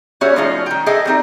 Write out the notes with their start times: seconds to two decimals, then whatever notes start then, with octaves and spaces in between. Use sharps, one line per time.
0.21 G3 C#4 F#4 G#4 C#5 E5
0.36 F3 G#3 A3 C#4 D#4 F4
0.66 D#3 G5
0.86 G#4 A4 D#5 E5 G5 A5
1.05 G3 C4 D#4